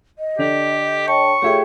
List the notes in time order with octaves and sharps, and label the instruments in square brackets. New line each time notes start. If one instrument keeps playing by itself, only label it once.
[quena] D#5
[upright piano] D3 D4 F7 [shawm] G4
[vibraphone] C#5 G5 A5 [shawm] C#6
[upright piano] A3 F4 E5 [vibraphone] G4 G#4 G5 [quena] C#5